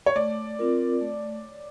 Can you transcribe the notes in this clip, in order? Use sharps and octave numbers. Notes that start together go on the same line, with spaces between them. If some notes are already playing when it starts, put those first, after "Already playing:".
C#5
A3 D5
C4 F4 A#4
A3